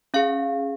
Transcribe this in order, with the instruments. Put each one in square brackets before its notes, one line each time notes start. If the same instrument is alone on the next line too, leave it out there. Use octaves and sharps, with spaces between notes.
[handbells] C#4 G#4 F5